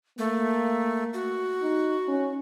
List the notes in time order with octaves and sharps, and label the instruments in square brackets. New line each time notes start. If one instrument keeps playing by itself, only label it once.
[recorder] A3 [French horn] A#3
[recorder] F#4
[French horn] D#4
C#4